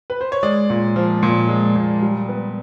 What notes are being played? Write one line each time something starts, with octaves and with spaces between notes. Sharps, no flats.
B4
C5
C#5
G#3 D5
A#2
F3
A#2
G#3
A#2
G3
B3